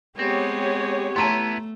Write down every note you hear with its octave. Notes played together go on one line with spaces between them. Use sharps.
G#3 B3 C4 G4 C#5
A3 B3 E4 B4 A5 A#5 C6